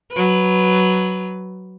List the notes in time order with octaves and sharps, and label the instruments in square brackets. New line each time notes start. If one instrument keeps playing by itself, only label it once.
[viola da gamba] F#3 B4